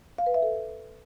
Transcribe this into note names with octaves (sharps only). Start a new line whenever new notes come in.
F5
B4
E5
A4